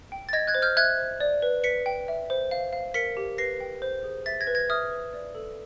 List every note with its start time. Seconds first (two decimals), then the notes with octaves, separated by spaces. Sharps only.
0.12 G5
0.29 A6
0.33 D#5 G#6 A#6
0.47 F#6 G#6
0.55 C5
0.62 F6 G6
0.77 E5 F#6 G#6
0.98 C5
1.20 D5
1.42 B4
1.63 B4 B6 C#7
1.86 G5
2.08 E5
2.30 C5
2.51 F5
2.73 F5
2.94 A#4 B6 C#7
3.17 G4
3.38 B4 A#6 C7
3.60 G5
3.82 C5
4.04 G#4
4.26 E5 A6 B6
4.41 G#6 A#6
4.47 B4
4.55 G#6 A#6
4.69 E5 D#6 F6
4.91 B4
5.14 D5
5.35 A4